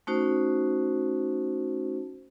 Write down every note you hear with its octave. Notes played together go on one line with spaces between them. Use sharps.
A3 C#4 D#4 F#4 C5